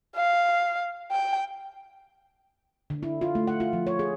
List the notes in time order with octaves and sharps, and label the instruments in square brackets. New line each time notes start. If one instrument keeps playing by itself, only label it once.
[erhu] F5
G5
[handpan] D3
E4
F4
A3
F#5
F4
F3
C#5
G#4